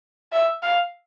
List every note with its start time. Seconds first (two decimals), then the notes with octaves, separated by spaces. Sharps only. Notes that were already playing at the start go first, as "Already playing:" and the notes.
0.32 E5
0.63 F5